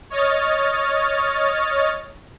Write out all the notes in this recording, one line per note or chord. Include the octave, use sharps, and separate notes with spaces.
C#5 D#5 F6 A6